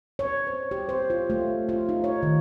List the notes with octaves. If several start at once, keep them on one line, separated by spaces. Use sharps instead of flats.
C#5
C5
G4
C5
F4
A3
F4
D#4
C#5
D#3